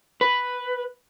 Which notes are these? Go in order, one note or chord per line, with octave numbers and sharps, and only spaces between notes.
B4